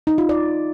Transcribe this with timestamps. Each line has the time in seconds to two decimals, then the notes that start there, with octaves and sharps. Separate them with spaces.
0.07 D#4
0.18 F4
0.29 D5